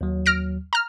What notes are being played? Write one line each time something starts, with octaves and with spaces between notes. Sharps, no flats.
D#2 F#3
F6 A#6 D7
A#5 F6